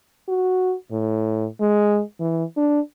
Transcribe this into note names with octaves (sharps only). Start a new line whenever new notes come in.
F#4
A2
G#3
E3
D4